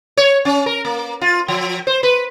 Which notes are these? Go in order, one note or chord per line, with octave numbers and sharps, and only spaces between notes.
C#5
C#4
A#4
A#3
F4
F3
C5
B4